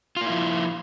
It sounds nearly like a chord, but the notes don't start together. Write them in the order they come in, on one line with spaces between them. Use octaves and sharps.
F4 A#3 E4 F3